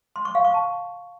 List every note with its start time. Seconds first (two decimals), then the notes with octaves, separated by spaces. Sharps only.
0.16 C6
0.25 C#6
0.35 F5
0.45 C#6
0.54 A5